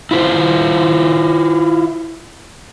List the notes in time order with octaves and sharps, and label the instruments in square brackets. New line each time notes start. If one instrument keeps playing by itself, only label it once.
[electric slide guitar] E4 F4 B4 C5